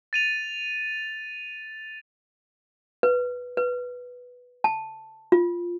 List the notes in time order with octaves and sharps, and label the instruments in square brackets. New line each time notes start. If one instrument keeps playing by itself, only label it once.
[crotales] A6 D#7 F7
[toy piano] B4
B4
A5
F4